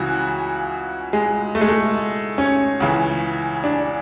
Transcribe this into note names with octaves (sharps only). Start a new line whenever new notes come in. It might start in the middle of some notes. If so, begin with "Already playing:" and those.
Already playing: C#2 C#3 E3 F#4
G#3
A3
G#3
A3
C#4
C#2 C#3 E3
D4